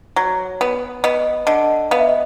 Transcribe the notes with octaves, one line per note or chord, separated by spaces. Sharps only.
F#3
B3
B3 D#5
D3 D#5
B3 F5
E5
D#5